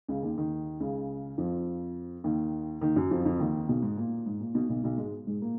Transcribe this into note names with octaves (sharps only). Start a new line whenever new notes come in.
C#2 C#3
D#2 D#3
D#2 D#3
C#2 C#3
F2 F3
D#2 D#3
D#2 D#3
F#2 F#3
F2 F3
F2 F3
D#2 D#3
B1 B2
G#2
A#2
G#2
A#2
B1 B2
B1 B2
B1 B2
G#2 G#3
G#2 G#3
A#2 A#3